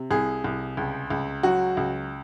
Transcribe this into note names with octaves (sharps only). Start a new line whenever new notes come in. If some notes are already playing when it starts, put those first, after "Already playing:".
Already playing: C3
C2 G#4
C2
C#2
C#2
F#3 F#4
C#2